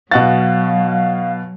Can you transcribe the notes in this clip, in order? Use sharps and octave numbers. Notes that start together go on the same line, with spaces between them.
B2 F#3 F#4 F5 A6